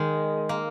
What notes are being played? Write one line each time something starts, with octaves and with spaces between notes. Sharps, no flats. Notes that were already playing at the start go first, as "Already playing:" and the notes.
Already playing: D#3 G#3
A#3